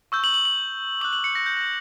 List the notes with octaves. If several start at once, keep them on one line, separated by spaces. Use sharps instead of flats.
C#6 E6 G6
F#7
F#7
F#7
D6 F#6 F#7
F#7
C#7
A#6
G6
A#6